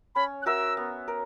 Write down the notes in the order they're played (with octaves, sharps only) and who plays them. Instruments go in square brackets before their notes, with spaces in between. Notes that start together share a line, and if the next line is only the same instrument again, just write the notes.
[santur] C#4 [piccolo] B5
[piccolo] F#6
[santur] F#4 A#4 E5 [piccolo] E6
[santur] B3
A#4